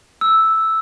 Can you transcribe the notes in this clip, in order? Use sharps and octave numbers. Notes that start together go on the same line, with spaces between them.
E6